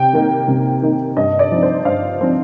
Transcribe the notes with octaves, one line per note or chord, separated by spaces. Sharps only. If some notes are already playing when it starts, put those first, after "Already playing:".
Already playing: C3 G5
D#3 A#3 D#4
C3
D#3 A#3 D#4
G2 D#5
D5
F3 C4 D#4
C5
G2 F5
F3 C4 D#4